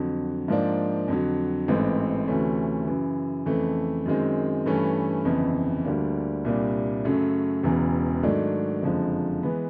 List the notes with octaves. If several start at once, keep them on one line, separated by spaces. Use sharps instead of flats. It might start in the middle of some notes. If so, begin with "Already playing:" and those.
Already playing: F2 D3 F#3
G#2 F3 A#3 D4
F2 D3 F#3
A1 G#2 E3 A3 C4
D2 C3 E3 A3 C#4
F#2 C#3 E3
F2 C#3 E3 A3
F#2 D#3 G#3 C4
G2 E3 A3 C#4
G1 F2 C#3 E3
D2 D3 G3 A#3 D4
C2 A#2 G3 A#3 D4
F#2 C#3 F#3 A3
E1 E2 C#3 E3
G#2 D#3 F#3 A3 D4
F#1 F2 D3 F3 G#3
E3 G#3 B3